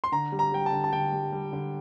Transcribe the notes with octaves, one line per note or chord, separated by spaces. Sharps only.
C6
D3 A#5
G3
A#5
G3 G5
A5
D3
A5
D3 G5
G3
G3
D3